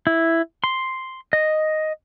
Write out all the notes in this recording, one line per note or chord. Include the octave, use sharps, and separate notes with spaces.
E4
C6
D#5